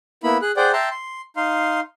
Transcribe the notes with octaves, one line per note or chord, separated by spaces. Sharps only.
A#3 B3 E4 B5
G#4 F#6
G#4 C5 D5 F#5 G5
E5 G5 A5 A#5 C6
C6
D#4 F5 C6